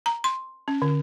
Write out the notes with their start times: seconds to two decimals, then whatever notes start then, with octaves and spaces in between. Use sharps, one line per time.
0.06 A#5
0.24 C6
0.68 C#4
0.82 D3